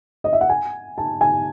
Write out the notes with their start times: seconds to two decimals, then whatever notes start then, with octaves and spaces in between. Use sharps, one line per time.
0.24 D#5
0.33 E5
0.41 F#5
0.49 G#5
0.98 A5
1.21 G#5